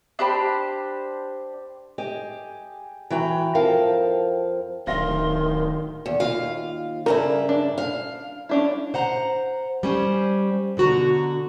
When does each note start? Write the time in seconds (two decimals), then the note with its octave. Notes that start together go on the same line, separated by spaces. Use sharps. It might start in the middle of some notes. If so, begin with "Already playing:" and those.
0.19 D4 G4 C5 B5
1.98 G4 G#4 D#5
3.10 E3 F#4 G5 A#5
3.55 F2 F3 A#4 F5 G5 A5
4.87 D1 D#3 E5 F5 C6 A#6
6.06 E2
6.20 D#2 F4 F5
7.06 G2 C#3 E4 A#4
7.49 D4
7.78 F5
8.49 C#4 D4 E4
8.94 C5 F#5 A#5
9.83 G3 C#4 C5
10.77 B2 D3 F#4 A#5